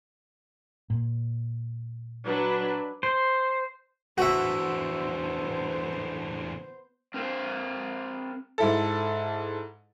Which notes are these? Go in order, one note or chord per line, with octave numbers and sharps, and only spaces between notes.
A#2
F#3 D4 B4
C5
E2 D3 B3 F#4 C5 E5
C4 A#4 C5 F5
G#2 E4 A4